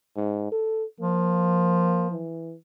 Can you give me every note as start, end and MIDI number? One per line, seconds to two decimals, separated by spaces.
0.16 0.47 44
0.52 0.84 69
1.00 2.23 53
1.00 2.07 58
2.11 2.54 52